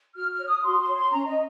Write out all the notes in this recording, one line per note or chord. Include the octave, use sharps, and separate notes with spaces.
F#4 F6
F6
C#5
D#6
F#4 C6
C6
C#5
C6
C#4 A#5
D#5